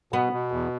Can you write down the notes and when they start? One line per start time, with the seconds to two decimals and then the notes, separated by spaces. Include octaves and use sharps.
0.13 B2 B3
0.33 B2
0.52 E2